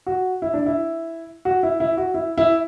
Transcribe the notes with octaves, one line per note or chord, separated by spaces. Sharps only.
F#4
E4
D4
E4
F#4
E4
E4
F#4
E4
E4